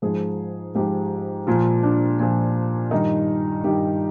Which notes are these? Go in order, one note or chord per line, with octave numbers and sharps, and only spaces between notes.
G#2 F3 G#4
G#2 F3 G4
A#2 F3 F4
D4
A#2 F3
G2 D#3 D#4
G2 D#3 G4